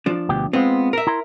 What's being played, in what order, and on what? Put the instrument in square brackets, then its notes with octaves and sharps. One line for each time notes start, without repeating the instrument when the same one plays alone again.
[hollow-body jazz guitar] F3 D4
[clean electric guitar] D2 B2 G4
[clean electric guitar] G#3 F4 [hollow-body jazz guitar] B3 C4
[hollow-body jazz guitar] A#4 E5
[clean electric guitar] E4 A#5 C6